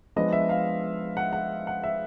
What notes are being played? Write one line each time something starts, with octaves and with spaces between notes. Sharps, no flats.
F3 G#3 B3 D4 D#5
E5
F5
F#5
F#5
F#5
E5